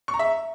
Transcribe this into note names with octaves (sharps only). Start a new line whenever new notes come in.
C#6
A#5
E5